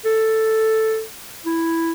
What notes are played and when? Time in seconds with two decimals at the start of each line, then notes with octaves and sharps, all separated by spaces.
0.05 A4
1.46 E4